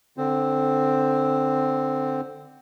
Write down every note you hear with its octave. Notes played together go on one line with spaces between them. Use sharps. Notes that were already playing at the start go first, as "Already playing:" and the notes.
D3 C4